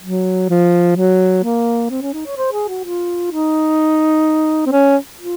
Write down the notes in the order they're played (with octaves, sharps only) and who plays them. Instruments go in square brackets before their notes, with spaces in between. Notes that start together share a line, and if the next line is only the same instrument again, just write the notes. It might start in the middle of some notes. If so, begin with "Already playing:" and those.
[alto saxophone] F#3
F3
F#3
A#3
C4
C#4
D#4
C#5
C5
G#4
F#4
F4
D#4
C4
C#4
F4